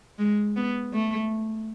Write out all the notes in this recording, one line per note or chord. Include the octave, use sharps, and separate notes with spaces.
G#3
B3
A3